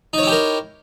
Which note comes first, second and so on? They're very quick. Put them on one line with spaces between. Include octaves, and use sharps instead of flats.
D#4 C#5 E4 G4 A#4